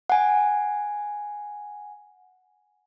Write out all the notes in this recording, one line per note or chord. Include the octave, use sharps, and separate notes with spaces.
F#5 G#5